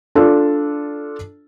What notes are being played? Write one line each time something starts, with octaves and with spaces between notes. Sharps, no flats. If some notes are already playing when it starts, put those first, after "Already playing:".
D4 F4 A4